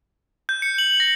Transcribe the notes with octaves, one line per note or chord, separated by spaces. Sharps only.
G6
C#7
F#7
A#6